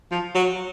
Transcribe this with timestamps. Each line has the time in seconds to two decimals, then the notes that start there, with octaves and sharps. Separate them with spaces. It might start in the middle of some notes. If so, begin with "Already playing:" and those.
0.11 F3
0.35 F#3